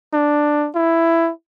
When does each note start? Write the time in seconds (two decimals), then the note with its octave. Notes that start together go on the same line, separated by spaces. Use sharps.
0.13 D4
0.75 E4